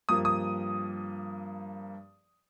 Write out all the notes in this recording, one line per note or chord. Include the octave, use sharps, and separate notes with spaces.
G2 F3 A#3 D#6
D#6